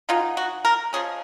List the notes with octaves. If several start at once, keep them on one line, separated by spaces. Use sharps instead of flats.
B2 G#3 D#4 F4
F#4
A#4
F3 G#3 C#4 G#4